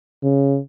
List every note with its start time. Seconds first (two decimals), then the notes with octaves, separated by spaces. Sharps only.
0.23 C#3